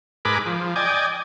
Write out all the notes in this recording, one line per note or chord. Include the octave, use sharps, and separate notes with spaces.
G#2 G#4 A#4 B4 B5 D6
F3
D5 D#5 G5 G#5